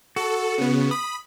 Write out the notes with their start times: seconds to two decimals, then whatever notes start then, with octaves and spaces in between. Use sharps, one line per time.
0.16 F#4 A4
0.58 C#3 B3
0.91 B5 D#6